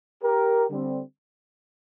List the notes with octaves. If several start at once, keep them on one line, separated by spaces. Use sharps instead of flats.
G4 A#4
D3 G3 C4